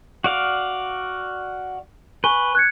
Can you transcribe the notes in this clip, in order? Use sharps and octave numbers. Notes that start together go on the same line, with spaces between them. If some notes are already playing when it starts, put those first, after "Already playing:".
F#4 D5 F5
B4 G#5 C#6 G7
F#6 G#6 C#7